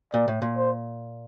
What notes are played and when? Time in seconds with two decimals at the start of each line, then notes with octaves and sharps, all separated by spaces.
0.13 A#2 D5
0.28 A2
0.42 A#2
0.57 C5